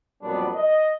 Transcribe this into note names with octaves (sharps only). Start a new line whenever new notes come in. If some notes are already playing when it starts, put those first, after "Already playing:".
F2 A#2 F#3 G3 B3 D4
D#5